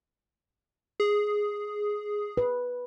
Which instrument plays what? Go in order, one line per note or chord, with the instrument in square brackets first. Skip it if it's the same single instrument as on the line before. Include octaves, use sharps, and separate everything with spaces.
[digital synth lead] G#4
[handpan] B4